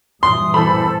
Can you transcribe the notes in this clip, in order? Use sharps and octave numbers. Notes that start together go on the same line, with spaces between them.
G2 A#2 E3 C6 D#6
E2 A4 C5 B5